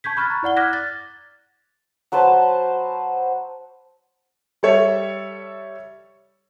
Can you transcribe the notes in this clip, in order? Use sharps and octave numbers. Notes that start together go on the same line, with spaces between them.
A5 C#6 G6 G#6 B6
B5 C#6 F6 F#6 G#6 A6
A#5
E4 D5 F#5 G7
D6 F6 F#6 G#6 A#6 B6
A6
F#3 B4 C5 A5
G3 A4 C#5 E5